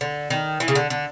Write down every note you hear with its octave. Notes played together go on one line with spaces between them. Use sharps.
D3
D#3
E3
C#3
D3
D3